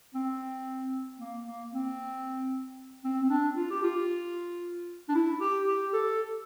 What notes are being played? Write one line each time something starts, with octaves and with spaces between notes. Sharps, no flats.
C4
A#3
A#3
C4
C4
C4
D4
F4
G4
F4
D4
E4
G4
G4
A4